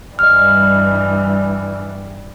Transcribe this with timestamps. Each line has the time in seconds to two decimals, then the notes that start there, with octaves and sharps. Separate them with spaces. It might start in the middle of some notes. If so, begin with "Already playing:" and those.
0.19 G2 E3 G3 D#5 F6